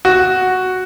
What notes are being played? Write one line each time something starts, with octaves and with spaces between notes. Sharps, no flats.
F#4